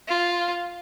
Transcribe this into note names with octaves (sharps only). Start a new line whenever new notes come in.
F4